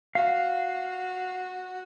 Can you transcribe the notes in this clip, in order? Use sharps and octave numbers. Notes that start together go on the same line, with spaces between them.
F#4 F5